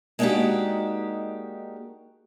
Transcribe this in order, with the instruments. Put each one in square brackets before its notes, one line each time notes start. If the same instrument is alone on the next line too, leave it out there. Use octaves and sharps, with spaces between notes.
[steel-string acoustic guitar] G#3 A#3 D4 D#4 F#4 G4